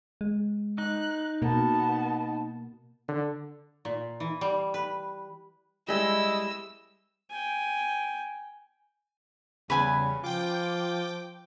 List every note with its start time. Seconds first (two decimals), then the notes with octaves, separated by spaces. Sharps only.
0.21 G#3
0.78 D#4 F#6
1.42 B2 A#3 B3 A#4 A5
3.08 D3
3.85 A#2
4.20 E3
4.41 G3
4.74 B4
5.89 G3 G#3 E4 D#5 E6
7.30 G5 G#5
9.70 E2 C#3 G3 B4 G#5 B5
10.24 F3 F4 G5 D6